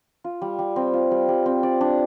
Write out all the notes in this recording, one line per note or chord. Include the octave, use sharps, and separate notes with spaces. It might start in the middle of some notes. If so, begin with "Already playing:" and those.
F4
G3
G3
C4
F4
G3
G3
C4
D5
D4